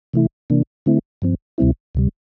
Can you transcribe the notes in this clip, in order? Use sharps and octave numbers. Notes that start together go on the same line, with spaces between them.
C3 E3 A3 E4
C3 E3 A#3 D4
D3 A3 C4 E4
G2 F3 C4
D2 C3 G3 C4 E4
D2 C3 G3